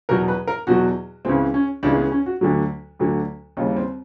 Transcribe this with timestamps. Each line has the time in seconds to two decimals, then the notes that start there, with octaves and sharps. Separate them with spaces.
0.09 E2 B2 F#3 A#4
0.28 B4
0.47 A#4
0.67 E2 B2 F#3 F#4
1.25 C#2 C#3 E3 G#3 C4
1.54 C#4
1.83 C#2 C#3 E3 G#3 D4
1.97 B3
2.12 C#4
2.26 F#4
2.41 D2 D3 F#3
2.99 D2 D3 F#3
3.57 D#2 C#3 E3 G3 D#4
3.76 C4